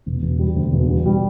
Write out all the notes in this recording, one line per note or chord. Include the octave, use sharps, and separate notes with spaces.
E1
E1
G3
D2
E1
G3
G3